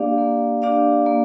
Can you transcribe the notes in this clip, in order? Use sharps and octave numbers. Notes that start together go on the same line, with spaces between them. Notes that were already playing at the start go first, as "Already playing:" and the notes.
Already playing: A#3 D4 G4 D5 F5
A#3
D4 G4 D5 F5
A#3